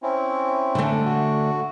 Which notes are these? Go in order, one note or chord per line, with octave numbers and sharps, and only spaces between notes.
C4 C#4 E4
D3 A3
F#4